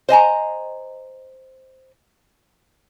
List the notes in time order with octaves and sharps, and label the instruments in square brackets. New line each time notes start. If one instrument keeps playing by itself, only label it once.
[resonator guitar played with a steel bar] C5 D#5 G#5 A#5